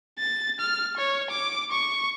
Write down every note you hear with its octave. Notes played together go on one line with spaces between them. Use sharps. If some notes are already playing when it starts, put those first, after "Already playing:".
A6
F6
C#5
D6
C#6